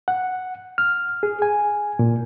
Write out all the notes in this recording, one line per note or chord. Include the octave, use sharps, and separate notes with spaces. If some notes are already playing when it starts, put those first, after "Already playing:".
F#5
F6
G#4
G#5
A#2